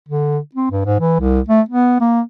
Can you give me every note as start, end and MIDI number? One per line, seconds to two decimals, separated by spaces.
0.08 0.38 50
0.55 0.70 60
0.71 0.83 43
0.86 0.98 44
1.00 1.15 52
1.20 1.40 36
1.48 1.61 57
1.69 1.99 59
2.00 2.21 58